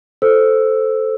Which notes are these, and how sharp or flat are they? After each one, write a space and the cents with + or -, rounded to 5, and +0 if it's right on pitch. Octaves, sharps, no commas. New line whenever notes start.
A4 +0 C5 +0 E6 +0